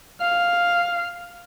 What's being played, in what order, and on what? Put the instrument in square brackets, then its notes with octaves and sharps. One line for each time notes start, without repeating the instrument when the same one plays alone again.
[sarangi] F5